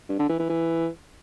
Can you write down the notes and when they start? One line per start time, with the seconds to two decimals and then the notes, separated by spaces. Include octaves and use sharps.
0.09 G2
0.19 D3
0.29 E3
0.39 E3
0.49 E3